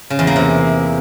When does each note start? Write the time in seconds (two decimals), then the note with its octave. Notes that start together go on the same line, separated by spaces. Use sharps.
0.10 C#3
0.19 E2
0.27 A#3
0.36 C3